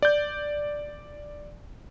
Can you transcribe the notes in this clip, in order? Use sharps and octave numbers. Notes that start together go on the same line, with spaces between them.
D5 G6